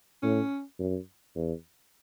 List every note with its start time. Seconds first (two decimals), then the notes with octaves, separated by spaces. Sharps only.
0.23 A2 C#4
0.80 F#2
1.36 E2